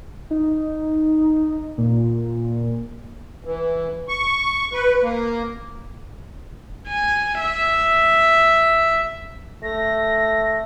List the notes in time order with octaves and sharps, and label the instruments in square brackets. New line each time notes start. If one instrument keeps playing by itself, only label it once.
[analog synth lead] D#4
A#2
[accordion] E3
C#6
B4
A#3
[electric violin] G#5
E5
[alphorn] A3 [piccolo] A#6